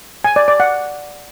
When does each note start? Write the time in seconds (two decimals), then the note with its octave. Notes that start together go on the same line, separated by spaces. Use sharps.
0.24 G#5
0.36 D5
0.48 D5
0.60 F#5